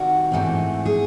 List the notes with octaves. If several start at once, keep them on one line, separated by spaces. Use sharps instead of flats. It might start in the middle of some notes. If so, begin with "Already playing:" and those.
Already playing: C3 D#3 G3 F#4
G#2 E3 A3 C4
G#4